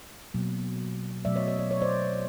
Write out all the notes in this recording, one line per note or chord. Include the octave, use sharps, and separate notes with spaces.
B2 F#3 A#3
B2 F#3 A3 D5 E5
C#5 D#5
C#5 D#5
D5
C#5
C5 D5